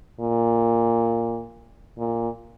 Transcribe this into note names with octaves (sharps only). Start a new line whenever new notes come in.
A#2
A#2